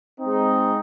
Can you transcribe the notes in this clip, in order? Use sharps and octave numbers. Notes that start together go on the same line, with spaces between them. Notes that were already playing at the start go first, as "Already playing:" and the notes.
G#3 C4 D#4